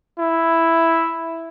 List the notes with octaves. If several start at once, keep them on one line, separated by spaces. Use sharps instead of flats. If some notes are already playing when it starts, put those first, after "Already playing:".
E4